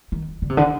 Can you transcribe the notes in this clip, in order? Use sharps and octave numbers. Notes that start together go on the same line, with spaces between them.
D#3
D3
C3
D3